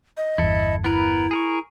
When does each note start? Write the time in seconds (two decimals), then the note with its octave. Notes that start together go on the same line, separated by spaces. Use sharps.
0.17 D#5
0.38 G1 E2 E4 A4
0.84 B3 E4 A#4 B4
1.31 G#4 A#4 C#6